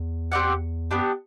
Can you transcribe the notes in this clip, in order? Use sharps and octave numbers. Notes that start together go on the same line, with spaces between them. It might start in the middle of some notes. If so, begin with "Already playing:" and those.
Already playing: E2
C4 G4 D5 F#5
F#2 B3 D4 G4